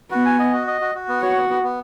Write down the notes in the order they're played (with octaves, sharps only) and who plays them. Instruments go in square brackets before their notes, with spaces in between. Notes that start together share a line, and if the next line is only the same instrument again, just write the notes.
[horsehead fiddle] B3 [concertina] F#4
[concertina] G#5
D#5
F#4
D#5
F#4
F#4
B3
[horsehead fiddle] F#4 [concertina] C#5
[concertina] B3
B3
B3